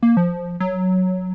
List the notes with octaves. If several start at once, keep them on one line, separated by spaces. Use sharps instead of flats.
A#3
F3
F#3